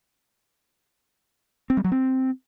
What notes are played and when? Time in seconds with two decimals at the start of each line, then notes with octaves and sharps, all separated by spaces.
1.70 C4
1.77 G3
1.84 F#3
1.92 C4